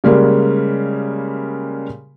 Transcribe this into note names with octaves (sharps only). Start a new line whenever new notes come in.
C#3 G3 G#3 A#3